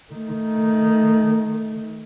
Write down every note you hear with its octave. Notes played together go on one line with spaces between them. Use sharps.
D#3 A3